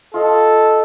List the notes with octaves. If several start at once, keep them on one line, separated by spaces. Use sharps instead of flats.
F4 A4 D#5 F5